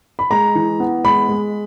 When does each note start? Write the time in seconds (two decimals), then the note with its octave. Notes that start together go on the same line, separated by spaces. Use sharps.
0.19 B5
0.31 G#3 A#5
0.55 E3
0.80 B3
1.04 G#3 B5
1.29 G#3